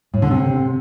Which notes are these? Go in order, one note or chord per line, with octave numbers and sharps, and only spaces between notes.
A2
D3
C3